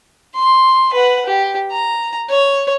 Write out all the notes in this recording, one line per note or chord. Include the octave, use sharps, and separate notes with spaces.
C6
B4 F#5
G4
A#5
C#5